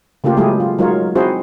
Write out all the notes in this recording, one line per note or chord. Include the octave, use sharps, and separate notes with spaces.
C#3 A3 A#3 F4 G4
F#3 G#3 A3 E4 G4 G#4
F4
F#3 G#3 D#4 F4 A#4 C#5
C4 D#4 E4 F#4 G#4 C5